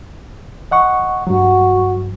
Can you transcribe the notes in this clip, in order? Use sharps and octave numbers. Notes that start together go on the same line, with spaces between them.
D#5 F#5 C#6
G2 F#3 F#4